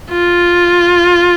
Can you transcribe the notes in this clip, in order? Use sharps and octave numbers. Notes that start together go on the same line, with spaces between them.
F4